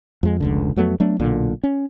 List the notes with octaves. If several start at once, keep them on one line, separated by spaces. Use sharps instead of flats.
F2 G#3
F1 C#2 D3
F2 F#3 A3 B3
F#3 A3 B3 D4
B1 A#2 D3
C#4